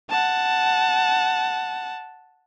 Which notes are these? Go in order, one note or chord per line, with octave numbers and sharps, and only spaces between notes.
F#5 A5